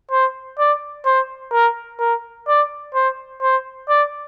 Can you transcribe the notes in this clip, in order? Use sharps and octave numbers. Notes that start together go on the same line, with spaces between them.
C5
D5
C5
A#4
A#4
D5
C5
C5
D5